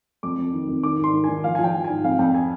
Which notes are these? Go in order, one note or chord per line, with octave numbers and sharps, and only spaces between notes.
F2 D6
F2
D#3
F2
D#3 D6
G#2 C6
D#3
D#3 G#5
F3 F5
F3 G#5
G5
F3
G#5
G#2
F2 F5
F2 G5
G#5